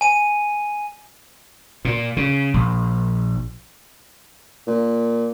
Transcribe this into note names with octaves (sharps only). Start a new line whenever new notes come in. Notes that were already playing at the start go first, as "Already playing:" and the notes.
G#5 D#7
A#2
C#3
A#1
A#2